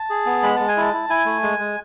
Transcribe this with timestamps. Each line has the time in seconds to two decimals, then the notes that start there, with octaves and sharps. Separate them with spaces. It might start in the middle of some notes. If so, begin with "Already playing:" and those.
Already playing: A5
0.10 G#4
0.26 B3
0.43 G#3 B5
0.56 G#3 A5
0.68 G#5
0.77 E4 A5
0.93 E4
1.09 E4 G#5
1.26 A3
1.43 G#3
1.59 G#3